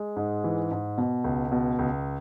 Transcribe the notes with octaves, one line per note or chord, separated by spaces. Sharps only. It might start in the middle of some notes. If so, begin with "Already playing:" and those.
Already playing: G#3
G#2
E3
G#2
B2
C#2
B2
C#2